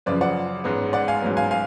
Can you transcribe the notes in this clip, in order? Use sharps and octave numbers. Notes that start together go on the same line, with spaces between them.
F#2 C#3 F3 B4 D5
D5 F#5
A1 G#2 G#3 B3
D5 F#5
F5 G#5
A1 G#2 F#3 B3
F5 G#5
F5 G#5